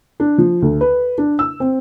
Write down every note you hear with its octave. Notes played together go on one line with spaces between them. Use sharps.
D4
F3
D2
B4
D4
E6
C4